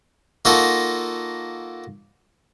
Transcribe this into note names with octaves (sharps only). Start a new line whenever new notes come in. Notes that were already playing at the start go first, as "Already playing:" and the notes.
A#3 D#4 F4 F#4 A4